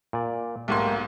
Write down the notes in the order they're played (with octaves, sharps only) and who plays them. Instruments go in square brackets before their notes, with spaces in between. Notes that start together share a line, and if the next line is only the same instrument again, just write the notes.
[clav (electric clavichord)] A#2 D5
[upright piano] B1 G#2 C6 [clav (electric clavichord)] A3 G4 [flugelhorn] A#3